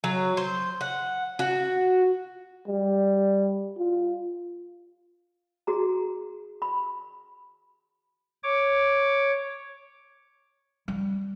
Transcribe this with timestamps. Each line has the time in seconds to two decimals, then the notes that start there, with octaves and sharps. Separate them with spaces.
0.04 F#3
0.37 C5
0.81 F#5
1.39 F#4
2.67 G3
3.78 F4
5.67 F#4 G#4 A#5
6.62 B5
8.43 C#5 D6
10.88 G3